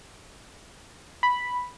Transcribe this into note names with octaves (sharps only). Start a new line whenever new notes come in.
B5